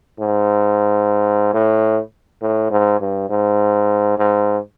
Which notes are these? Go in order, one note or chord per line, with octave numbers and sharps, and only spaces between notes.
G#2
A2
A2
G#2
G2
G#2
G#2